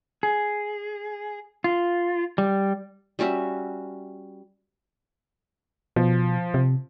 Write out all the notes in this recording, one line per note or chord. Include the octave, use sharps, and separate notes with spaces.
G#4
F4
G3
G3 C#4 F#4 E5
B2 F3
C3